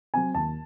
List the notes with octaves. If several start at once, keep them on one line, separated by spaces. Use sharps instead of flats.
F#3 C4 G#5
D#2 A5